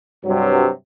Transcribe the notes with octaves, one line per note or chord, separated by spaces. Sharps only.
G2 C3 F#3